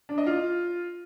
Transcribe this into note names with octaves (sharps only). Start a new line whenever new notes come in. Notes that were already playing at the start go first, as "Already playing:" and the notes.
D4
D#5
F4